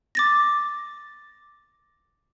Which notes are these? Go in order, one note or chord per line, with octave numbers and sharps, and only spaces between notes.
D6 A6 A#6